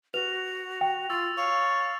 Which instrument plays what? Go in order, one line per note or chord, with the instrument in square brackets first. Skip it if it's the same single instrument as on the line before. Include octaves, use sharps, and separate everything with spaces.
[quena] F#4 [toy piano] B4 [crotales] F7
[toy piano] G5
[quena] F4 [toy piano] C#6 [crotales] E6 A6
[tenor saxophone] C#5 [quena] F5